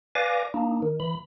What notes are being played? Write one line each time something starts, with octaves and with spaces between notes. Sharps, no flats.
B4 D5 F5 G#5 D6 A#6
A#3 D4 D#4
D#3
E3 B5